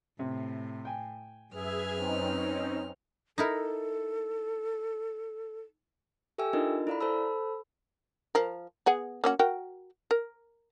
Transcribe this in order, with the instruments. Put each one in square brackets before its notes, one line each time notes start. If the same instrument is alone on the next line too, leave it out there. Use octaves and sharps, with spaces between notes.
[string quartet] A2 [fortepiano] C3
[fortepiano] G5 G#5
[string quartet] F#2 B4 F6 [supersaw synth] G#4 E5 G#6
[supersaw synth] C4 C#4 D#4
[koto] D#4 E4 A#4 [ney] A4
[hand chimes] G4 A4 E5 G5 G#5 E6
D4 D#4 F4 A#4 D#5
E4 A4 D5 F5 A#5 B5
A4 C5 A5 B5 E6
[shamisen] F3 A#4
B3 G#4 F#5
A#3 C#4 F#4
F#4 A#4 G5
A#4